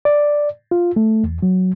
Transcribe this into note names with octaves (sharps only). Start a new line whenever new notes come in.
D5
F4
A3
E2
F#3